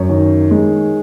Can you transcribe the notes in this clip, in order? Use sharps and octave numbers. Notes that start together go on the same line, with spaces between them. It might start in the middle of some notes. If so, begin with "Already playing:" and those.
Already playing: F#2 C#5
D#3
G#3